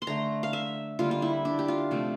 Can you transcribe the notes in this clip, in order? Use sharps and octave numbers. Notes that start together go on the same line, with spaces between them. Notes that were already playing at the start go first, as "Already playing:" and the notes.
C6
D3 A3 A#5
F5
E5
D3 G3 A#3 F4
F4
E4
D4
G4
F4
C3 F3 A3